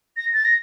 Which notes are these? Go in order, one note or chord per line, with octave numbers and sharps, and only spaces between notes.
A#6
A6
A#6